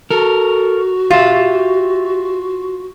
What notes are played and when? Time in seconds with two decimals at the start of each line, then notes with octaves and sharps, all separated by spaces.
0.11 F#4 A4 A#4
1.11 F4 G4 E5